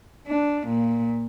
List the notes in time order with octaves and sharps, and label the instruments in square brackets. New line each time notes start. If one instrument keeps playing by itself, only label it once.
[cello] D4
A#2